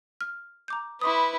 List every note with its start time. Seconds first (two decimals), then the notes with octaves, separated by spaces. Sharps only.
0.21 F6
0.68 A#5 D6 G6
1.01 E4 B4 C6 D6 D#6